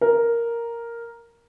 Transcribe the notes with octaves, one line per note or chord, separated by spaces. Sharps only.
A#4